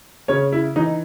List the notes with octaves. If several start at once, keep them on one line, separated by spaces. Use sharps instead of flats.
C#3 C#4 C#5
E4
E3 D#4